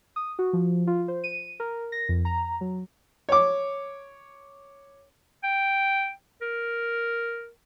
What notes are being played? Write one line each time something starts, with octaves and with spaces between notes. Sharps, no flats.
D#6
F#4
F3
F4
C5
D#7
A#4
A#6
F2
A#5
F#3
C#5 D6
G5
A#4